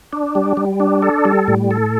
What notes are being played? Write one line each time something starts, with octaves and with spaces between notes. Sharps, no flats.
D4
G3
G3
D4
A4
G3
A2
A4